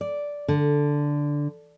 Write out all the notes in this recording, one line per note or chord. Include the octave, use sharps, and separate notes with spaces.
D5
D3